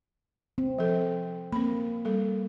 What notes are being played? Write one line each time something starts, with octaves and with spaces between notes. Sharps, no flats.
C4
F3 A4
A#3 C4 B5
G3 A4